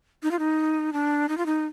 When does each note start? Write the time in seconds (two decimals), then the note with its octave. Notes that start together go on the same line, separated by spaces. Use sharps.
0.23 D#4
0.31 F4
0.39 D#4
0.93 D4
1.29 D#4
1.37 F4
1.46 D#4